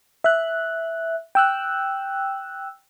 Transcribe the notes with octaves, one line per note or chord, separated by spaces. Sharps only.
E5 F#6
G5 E6 F#6